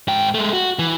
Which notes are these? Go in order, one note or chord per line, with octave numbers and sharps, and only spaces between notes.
G#2 G5
G#3 A3
F#4
E3